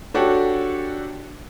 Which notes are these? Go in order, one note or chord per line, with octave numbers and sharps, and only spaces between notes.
D4 F#4 G4 A4 C#5